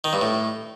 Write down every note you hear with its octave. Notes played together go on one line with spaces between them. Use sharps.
D#3
G2
A2